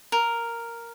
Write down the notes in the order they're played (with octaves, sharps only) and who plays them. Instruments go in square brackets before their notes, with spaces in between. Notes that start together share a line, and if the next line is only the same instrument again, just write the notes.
[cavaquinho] A#4